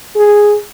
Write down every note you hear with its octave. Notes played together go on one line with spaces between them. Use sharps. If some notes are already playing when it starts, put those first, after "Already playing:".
G#4